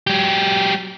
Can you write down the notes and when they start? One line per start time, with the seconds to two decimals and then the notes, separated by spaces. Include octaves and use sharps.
0.07 F#3 G4